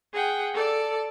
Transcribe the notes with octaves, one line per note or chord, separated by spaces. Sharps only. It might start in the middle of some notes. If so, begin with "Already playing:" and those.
G#4 F#5 G5
A4 D5 A5